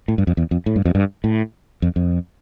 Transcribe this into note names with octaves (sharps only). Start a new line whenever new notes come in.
A2
G2
F2
E2
F2
A2
G2
F2
G2
A2
F2
F2